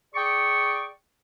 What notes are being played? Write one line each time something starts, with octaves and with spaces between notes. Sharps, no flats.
G#4 D5 G5 C#6